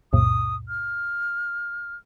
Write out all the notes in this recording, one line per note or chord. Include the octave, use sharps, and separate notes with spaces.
C#2 F#2 A#2 D#6
F6